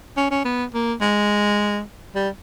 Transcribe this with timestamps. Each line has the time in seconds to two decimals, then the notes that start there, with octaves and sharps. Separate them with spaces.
0.17 C#4
0.31 C#4
0.45 B3
0.74 A#3
1.01 G#3
2.15 G3